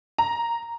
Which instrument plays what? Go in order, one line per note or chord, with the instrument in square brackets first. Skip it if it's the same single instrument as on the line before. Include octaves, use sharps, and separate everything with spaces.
[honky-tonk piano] A#5